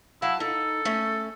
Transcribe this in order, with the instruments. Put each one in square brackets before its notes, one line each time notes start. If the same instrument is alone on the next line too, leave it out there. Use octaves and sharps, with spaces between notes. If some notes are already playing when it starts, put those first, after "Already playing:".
[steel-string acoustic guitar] F#3 F5 A5 [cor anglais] E4
[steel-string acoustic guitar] D#4 [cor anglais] A4
[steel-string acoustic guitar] A3 C#4